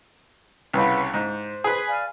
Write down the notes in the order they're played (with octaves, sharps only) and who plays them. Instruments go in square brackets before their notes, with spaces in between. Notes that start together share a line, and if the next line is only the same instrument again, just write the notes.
[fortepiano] C2 C#3 [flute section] B4 C#5 F#5
[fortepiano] G#2 [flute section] C5
[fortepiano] G#4 B4
[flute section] D5 F5 G#5